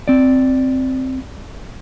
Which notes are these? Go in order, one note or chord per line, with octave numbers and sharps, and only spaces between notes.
C4 D5